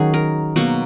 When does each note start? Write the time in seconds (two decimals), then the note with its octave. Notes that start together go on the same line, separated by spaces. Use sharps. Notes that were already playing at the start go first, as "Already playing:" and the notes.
Already playing: D#3 F#3 C#4 F#4 G#4
0.14 A#4
0.56 B2 F#3 A#3 F#4